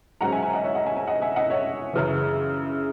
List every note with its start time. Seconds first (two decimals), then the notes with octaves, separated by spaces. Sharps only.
0.21 G#2 F#3 C#4 F#5 A#5
0.32 E5 G#5
0.43 E5 G#5
0.53 D#5 F#5
0.64 C#5 E5
0.75 D#5 F#5
0.86 E5 G#5
0.97 E5 G#5
1.07 D#5 F#5
1.22 E5 G#5
1.36 D#5 F#5
1.50 C#5 E5
1.93 F#2 C#3 E3